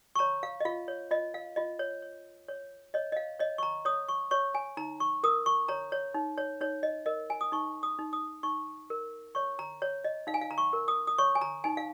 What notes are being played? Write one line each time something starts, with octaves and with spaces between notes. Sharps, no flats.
C#6
C#5 A#5
F5
D#5
F4 F5
C#5
F4 D#5
F5
F4 D#5
C#5
C#5
C#5
C#5 D#5
D#5
F5
C#5 D#5
C#6
A#5
C#5 D#6
C#6
C#5 C#6
G#5
D#4 A#5
C#6
A#4 D#6
C#6
C#5 A#5
C#5
D#4
C#5
D#4 C#5
D#5
A#4 D#5
G#5
D#6
D#4 C#6
D#6
D#4
D#6
D#4 C#6
A#4
C#5 C#6
A#5
C#5
D#5
D#4 F5
G#5
F5
A#5
C#6
A#4
D#6
D#6
C#5 C#6
G#5
A#5
D#4 G#5
F5